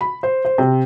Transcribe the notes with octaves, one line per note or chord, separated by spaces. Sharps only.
B5
C5
C5
C3